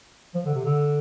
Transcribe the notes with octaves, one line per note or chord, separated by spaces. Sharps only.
F3
D3
C3
D3